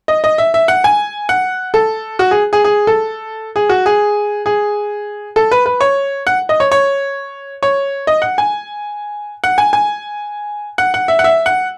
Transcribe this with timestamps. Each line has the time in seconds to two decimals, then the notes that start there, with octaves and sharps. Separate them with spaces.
0.08 D#5
0.24 D#5
0.38 E5
0.54 E5
0.68 F#5
0.84 G#5
1.29 F#5
1.74 A4
2.19 F#4
2.31 G#4
2.53 G#4
2.64 G#4
2.87 A4
3.56 G#4
3.69 F#4
3.86 G#4
4.46 G#4
5.36 A4
5.51 B4
5.66 B4
5.81 C#5
6.27 F#5
6.49 D#5
6.60 C#5
6.72 C#5
7.63 C#5
8.07 D#5
8.22 F#5
8.38 G#5
9.44 F#5
9.58 G#5
9.73 G#5
10.78 F#5
10.94 F#5
11.08 E5
11.19 F#5
11.24 E5
11.46 F#5